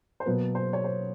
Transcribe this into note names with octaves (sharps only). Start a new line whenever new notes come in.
C5
B2 F#3 A#3 B4
C5
C#5
C5